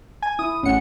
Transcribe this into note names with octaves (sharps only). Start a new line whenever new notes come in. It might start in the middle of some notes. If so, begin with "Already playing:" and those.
G#5
E4 D#6
A1 C#4 F#5 C#7